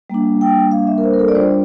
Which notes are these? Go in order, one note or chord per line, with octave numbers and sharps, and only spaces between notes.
G3 A#3 D4
G5
F5
E5
A#4
C5
A#4
A4
D5
G3 D4 F4 C5